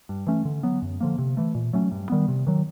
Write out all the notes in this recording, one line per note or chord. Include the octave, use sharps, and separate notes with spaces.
G2
E3 A3 C#4
D3
F#3 B3
F#2
D3 F3 A#3
C3
E3 A3
A#2
F#3 A3 C#4
G2
D#3 G3 B3
C3
D#3 F#3